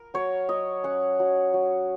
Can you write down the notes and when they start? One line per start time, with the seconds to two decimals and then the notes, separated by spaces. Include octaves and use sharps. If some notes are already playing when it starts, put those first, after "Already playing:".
Already playing: A#4
0.14 F#3 C#5
0.49 F#3 D#5
0.84 C#4 F#5
1.20 F#3
1.54 F#3